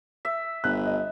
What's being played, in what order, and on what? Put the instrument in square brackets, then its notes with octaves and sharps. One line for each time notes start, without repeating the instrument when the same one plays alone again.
[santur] E5
[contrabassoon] G1 [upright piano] F#6
[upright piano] D#5